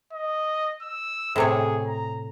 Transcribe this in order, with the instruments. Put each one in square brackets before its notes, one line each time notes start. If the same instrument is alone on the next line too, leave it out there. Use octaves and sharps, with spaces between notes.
[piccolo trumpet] D#5
E6
[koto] A2 C3 C#5 [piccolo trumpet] G#4
[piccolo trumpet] A#5